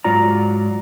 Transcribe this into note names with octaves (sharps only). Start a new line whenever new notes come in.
G#2 F#3 F4 D5 A#5